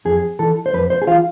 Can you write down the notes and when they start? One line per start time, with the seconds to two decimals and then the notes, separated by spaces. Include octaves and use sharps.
0.05 F2 G#4
0.39 E3 A4
0.66 C5
0.73 F2 B4
0.90 C5
1.02 G#4
1.07 E3 F4